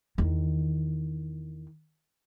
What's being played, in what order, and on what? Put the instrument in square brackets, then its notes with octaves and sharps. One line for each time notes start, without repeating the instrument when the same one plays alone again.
[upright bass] E2 D#3